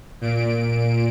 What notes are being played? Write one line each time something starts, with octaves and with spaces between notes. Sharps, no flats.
A#2 D7